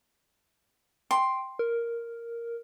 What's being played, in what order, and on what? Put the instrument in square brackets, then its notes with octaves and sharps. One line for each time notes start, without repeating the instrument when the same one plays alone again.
[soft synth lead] G5 [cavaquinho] C6
[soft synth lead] A#4